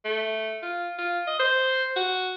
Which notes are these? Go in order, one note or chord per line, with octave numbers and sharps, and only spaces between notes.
A3
F4
F4
D#5
C5
F#4